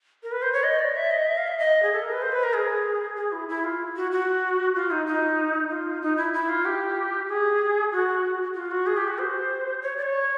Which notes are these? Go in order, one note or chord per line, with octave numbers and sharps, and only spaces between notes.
A#4
B4
C5
C#5
D#5
D5
E5
D#5
E5
F5
E5
D#5
G#4
A4
A#4
B4
C5
B4
A#4
G#4
G#4
E4
E4
F4
F#4
F#4
F4
D#4
D#4
F4
D#4
E4
E4
F4
G4
G#4
F#4
F4
F#4
G#4
G4
F#4
C5
C#5
D5
C#5